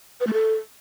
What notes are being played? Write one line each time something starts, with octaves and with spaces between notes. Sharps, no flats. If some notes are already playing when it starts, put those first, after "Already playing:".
B4
A3
A4